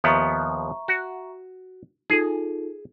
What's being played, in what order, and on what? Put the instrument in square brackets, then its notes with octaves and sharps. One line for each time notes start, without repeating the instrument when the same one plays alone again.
[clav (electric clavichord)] D#2 F3 B3 [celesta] E5 A#5 C#6
[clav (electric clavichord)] F#4
[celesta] D#4 F4 A4 [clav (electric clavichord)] G#4